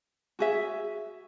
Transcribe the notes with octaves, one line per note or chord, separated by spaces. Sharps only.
F#4 G#4 E5